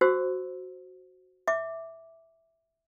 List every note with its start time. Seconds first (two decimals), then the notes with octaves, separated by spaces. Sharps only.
0.01 F#4 G4 C5 E6
1.48 E5 D6